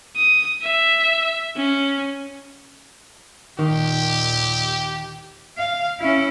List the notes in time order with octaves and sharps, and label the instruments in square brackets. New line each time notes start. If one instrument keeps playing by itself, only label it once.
[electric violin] D#6
E5
C#4
[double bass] D#2 A#2 [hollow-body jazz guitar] D#3 [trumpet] G4
[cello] F5
C#4 E4